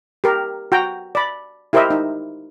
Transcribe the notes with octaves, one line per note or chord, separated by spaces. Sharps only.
G4 A#4
F#4 G5 A#5
D5 B5
E4 G4 A#4 C5 D#5 E5
D#4